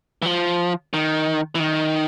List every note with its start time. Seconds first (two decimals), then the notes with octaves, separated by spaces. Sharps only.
0.22 E3
0.26 F3
0.93 D#3
1.55 E3
1.60 D#3